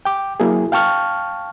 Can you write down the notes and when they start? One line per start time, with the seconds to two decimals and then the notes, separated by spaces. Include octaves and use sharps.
0.05 G5 D6
0.40 F#3 A#3 E4 F#4 G#4
0.72 F5 G5 A5 C#6 F6